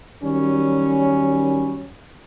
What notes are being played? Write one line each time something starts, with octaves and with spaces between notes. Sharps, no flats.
D#3 F#3 G3 C#4